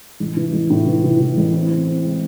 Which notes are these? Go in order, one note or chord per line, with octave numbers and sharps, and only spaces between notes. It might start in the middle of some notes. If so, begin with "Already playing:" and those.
A1
E3
A1
A2
E3
E3
E3
A1
C4
C4
C4
G#3